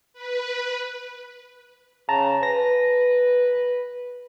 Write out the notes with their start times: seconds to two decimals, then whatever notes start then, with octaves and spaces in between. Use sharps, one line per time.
0.13 B4
2.09 C#3 A5 A#5
2.43 B4 A#6